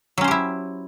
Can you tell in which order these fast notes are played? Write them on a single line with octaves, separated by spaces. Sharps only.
F#3 C#4 C5 G4 E4